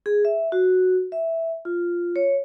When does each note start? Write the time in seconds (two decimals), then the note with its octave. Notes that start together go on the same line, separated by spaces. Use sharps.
0.06 G#4
0.25 E5
0.52 F#4
1.12 E5
1.65 F4
2.16 C#5